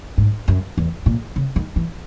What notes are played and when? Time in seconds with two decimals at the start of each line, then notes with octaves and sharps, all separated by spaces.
0.18 G#2
0.48 F#2
0.78 E2
1.06 A#2
1.36 C#3
1.56 D#3
1.76 E3